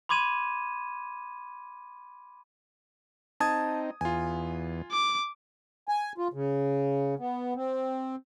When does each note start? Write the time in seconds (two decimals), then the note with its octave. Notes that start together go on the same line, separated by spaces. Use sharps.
0.09 B5 C6 D6 G#6 D#7 E7
3.40 C4 D#4 A5 D#6 G#6
4.01 E2 F4 G#5
4.91 D6
5.89 G#5
6.18 F4
6.33 C#3
7.19 B3
7.55 C4